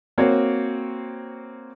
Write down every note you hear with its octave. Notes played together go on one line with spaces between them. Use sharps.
A#3 C4 F#4 C#5